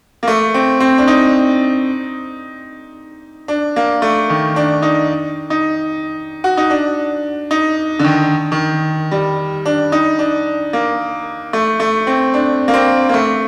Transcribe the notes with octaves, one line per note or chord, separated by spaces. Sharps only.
A#3
A3
C4
C4
D4
D#4
D4
A#3
A3
D#3
D4
D#4
D#4
F#4
D#4
D4
D#4
D3
D#3
D#3
G3
D4
D#4
D4
A#3
A3
A3
C4
D4
A#3
C4
A#3
A3